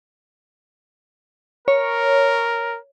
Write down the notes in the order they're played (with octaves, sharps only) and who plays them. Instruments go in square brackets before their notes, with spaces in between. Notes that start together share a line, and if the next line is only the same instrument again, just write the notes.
[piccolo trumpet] A#4 [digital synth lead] C#5